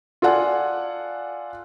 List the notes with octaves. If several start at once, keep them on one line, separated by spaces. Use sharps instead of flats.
F4 A4 D5 F#5 G#5